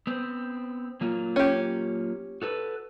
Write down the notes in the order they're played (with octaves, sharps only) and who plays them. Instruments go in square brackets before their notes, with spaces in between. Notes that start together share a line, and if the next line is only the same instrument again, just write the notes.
[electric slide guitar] B3 C4
F#3 A#3 F4
[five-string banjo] C#4 G4
[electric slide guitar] F#4 A4 B4